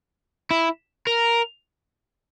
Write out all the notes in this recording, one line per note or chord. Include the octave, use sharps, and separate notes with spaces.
E4
A#4